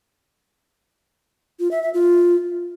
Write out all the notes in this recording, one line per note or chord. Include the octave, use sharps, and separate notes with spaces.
F4
E5
E5
F4